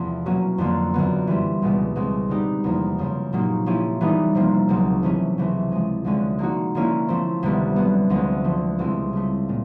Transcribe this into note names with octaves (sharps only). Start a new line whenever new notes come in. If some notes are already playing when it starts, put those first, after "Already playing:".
Already playing: E2 C3 F3 A3
B2 F#3 A#3 C#4 F#4
F2 D3 F3 A#3
F#2 D3 F#3 B3
E3 G3 C4
C#2 B2 G3
C#2 B2 G#3 C4
D3 G3 B3 D#4 G4
E2 C3 F3 A#3
F#2 C#3 F3
A#2 F#3 A#3 D#4 G4
F3 A#3 C#4 E4 G4
E3 G3 B3 D#4
C3 F3 A#3
C#2 B2 F#3
C3 E3 A3 C#4
C#2 C3 E3 A3 C4
F3 G#3 C#4
D2 D3 F3 G#3 C#4
D3 F3 A#3 D#4 F#4
D3 F3 A#3 C#4 E4
F3 A3 C4
D2 C3 D#3 G3 B3
D3 F#3 B3
D2 D3 F3 G#3 B3
D3 F3 A3
C#2 B2 G3 C4 E4
C#3 F3 A3
A#2